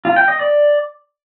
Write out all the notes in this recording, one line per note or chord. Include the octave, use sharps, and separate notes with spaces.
F4
G5
D#5
D5